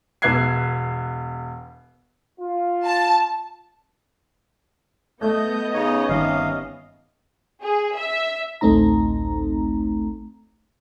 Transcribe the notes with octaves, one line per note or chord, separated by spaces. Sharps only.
E1 B3 E5 F#6 G#6 C7
F4
A5
A3 B3 D#5 G6
C#3 C#4 D#4 C#5
G1 C3 D#3 F5
G#4
E5
A1 D2 A3 C4 D#4 A#5